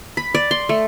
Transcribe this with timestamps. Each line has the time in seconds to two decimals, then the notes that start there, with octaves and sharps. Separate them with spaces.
0.17 B5
0.35 D5
0.51 C6
0.69 A3